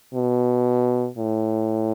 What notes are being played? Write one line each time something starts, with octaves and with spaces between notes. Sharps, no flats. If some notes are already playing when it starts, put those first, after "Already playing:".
B2
A2